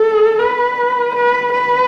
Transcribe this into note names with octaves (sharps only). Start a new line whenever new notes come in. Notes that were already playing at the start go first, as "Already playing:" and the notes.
Already playing: A4
B4
B4
B4